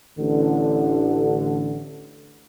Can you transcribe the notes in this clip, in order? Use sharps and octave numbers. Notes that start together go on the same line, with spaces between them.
A1 D3